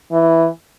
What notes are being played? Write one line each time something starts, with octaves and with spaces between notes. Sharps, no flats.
E3